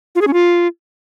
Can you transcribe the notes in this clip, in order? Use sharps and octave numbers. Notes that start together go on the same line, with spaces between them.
F4
G#4
C#4
F4